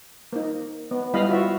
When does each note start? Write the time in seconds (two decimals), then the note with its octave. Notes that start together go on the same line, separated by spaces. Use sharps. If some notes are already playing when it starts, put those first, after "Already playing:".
0.33 A#3 D#4
0.91 B3
1.14 G3 B3 E4 D#5 F5 B5
1.29 F4 F#4 E5